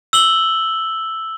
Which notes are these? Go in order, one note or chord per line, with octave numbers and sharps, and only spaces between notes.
E6 F#7 G7